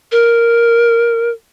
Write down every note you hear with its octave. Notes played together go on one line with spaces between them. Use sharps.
A#4